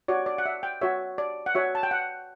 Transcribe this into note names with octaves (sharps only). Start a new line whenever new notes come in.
F#4 C#5 D5
D5
F#5
E5
G5
F#4 C#5 E5
D5
F#5
F#4 C#5 E5
A5
G5
F#5